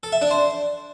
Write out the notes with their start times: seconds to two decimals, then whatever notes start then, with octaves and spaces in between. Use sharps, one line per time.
0.03 A4
0.12 E5
0.22 D4
0.31 C5